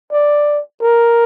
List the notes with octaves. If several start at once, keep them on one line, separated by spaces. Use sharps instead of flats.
D5
A#4